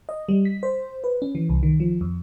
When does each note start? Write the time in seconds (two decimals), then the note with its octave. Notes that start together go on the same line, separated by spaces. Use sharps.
0.09 D#5
0.29 G3
0.45 B6
0.63 C5
1.04 B4
1.22 C#4
1.35 E3
1.49 C2
1.63 D#3
1.80 F3
2.01 F2